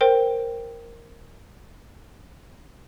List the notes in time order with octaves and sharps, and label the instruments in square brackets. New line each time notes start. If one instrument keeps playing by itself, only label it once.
[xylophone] A#4 C5 G5